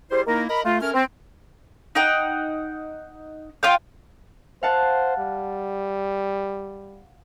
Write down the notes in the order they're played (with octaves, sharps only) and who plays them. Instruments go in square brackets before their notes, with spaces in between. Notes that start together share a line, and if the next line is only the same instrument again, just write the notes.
[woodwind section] G3 E4 G#4 C5
D#3 A#3 D#4 E4 A#4
A#4 D#5 A#5 B5
A3 F4
A3 C#4 A#4 F6
C4
[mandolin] D#4 F#5 G5
F4 F5 G5
[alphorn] C5 [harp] F5 F#5 A5
[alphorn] G3